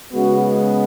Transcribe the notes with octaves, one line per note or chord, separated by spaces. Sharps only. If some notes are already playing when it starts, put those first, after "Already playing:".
C#3 G#3 B3 F#4